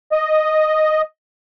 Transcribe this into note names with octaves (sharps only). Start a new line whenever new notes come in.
D#5